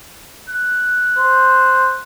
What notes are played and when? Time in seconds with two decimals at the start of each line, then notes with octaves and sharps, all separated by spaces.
0.49 F#6
1.17 C5